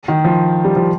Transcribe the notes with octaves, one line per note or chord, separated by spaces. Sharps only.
D#3
F3
G3
F3